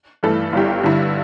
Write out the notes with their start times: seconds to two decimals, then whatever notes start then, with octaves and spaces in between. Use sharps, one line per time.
0.23 G2 E3 A3 E4 A4
0.53 G1 G2 G3 E4 G4
0.83 G2 D3 G3 E4